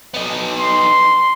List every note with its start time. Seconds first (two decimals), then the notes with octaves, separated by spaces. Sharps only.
0.14 B3 D#4
0.58 C6